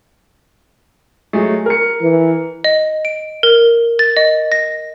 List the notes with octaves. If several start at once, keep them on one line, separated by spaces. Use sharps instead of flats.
F#3 G#3 A3
A#4 C#7
E3
D#5
D7
A#4
A6
D#5
A#6